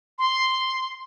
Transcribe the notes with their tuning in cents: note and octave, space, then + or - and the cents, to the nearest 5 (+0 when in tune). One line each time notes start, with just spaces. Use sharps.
C6 +0